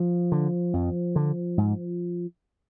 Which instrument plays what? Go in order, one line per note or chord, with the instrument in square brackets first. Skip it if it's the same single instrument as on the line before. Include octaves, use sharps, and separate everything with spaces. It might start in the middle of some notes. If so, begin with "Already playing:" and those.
Already playing: [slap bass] F3
D3
F2
D3
G#2